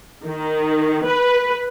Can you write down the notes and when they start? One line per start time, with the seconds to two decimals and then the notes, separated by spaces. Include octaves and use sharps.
0.24 D#3
1.06 B4